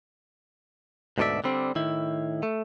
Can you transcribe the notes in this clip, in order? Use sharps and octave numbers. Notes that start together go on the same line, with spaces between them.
D2 G#2 B2 A4 D5 E5
D3 G3 C4
A2 D#3 E4
A3